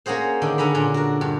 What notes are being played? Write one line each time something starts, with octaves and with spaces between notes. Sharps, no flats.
A#3 C#4 F#4 G#4 C5
D3 D#3 D4
D3 C#4 A#5 B5
A#2 D4
F#4 A#4
G2